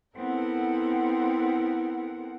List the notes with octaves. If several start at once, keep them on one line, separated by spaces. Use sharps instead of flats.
B3 C4 E4 A4 A#4 F#5